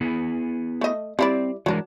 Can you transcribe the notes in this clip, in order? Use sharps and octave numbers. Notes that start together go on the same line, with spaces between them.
B3 E4 G#4
A3 D#5
G3 C4 E4 D5
E3 F#3 G#3 D4 A#4